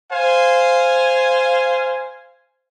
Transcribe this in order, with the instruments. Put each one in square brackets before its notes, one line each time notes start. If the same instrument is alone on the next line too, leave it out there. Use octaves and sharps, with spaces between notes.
[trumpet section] C5 F5 G#5